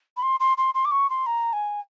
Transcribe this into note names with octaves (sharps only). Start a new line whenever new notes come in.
B5
C6
C6
C6
C6
D6
C#6
C6
A#5
G#5